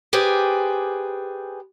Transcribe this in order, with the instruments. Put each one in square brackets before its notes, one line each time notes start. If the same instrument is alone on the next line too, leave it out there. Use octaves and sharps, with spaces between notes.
[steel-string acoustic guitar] G4 G#4 B4 C5 D5